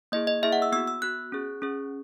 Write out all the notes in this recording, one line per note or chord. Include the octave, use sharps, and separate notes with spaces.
A#3 E4 G#4 D#5
D#5
A#3 E4 G#4 E5
F#5
E6
B3 F#4 E6
E6
B3 F#4 F#6
C#4 G#4
C#4 G#4